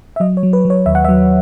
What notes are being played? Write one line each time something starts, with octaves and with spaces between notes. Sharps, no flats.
E5
F#3 D#5
C#5
F#3
B4
F#3
C#5
D#2 E5
F#5
F#3 E5